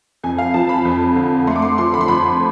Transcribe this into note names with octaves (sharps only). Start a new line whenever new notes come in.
F2 G#5
F5
F3 A5
B5
F2
D3
A3 C6
D6
C6
F3 C6
B5
C6
F2 B5